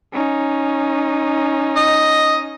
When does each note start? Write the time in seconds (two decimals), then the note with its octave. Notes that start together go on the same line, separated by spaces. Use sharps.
0.13 C#4 D#4
1.76 D#5